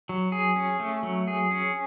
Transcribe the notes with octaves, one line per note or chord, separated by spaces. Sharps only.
F#3
G#4
C#4
A3
F#3
G#4
C#4